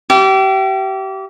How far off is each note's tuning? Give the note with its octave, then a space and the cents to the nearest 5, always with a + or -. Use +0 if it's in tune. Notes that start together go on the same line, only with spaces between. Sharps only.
G4 -30 E5 +40